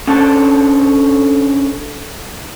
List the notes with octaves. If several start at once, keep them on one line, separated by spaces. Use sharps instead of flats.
C#4 D4 A4 C5 C#5 A5